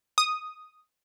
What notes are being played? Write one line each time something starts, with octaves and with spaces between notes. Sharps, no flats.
D#6